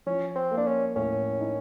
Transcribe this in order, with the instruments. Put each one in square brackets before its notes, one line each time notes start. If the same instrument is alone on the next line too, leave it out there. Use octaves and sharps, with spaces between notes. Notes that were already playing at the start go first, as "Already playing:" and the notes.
[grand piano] F3 [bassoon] C#4
[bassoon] C4
[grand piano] A#3
[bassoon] D4
C#4
[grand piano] A2 [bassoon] C#4
[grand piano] D#4